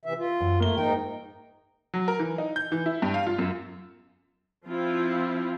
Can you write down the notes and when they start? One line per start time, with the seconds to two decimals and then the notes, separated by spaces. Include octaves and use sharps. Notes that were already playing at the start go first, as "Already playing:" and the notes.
0.05 C3 E3 E5
0.18 F4
0.40 F#2
0.60 A3 A#3 G7
0.78 G#2 D#4 A#4 G5
1.94 F#3
2.08 A#4
2.19 E3
2.38 D#4
2.56 G6
2.72 E3
2.86 E4
3.02 G2
3.14 F5
3.27 F4
3.39 F#2
4.66 F3 C4 E4 F4